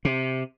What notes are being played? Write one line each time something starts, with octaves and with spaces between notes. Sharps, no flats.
C3